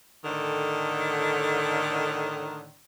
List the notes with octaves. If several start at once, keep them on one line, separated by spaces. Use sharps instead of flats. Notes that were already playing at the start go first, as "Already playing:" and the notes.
A2 D3 D#3